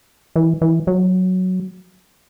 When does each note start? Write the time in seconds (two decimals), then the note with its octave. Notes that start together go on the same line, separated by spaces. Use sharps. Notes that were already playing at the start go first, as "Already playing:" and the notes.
0.36 E3
0.61 E3
0.87 F#3